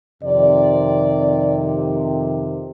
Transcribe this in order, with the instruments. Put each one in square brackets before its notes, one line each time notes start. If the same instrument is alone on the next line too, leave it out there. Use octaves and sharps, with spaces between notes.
[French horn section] F2 C3 D#3 D5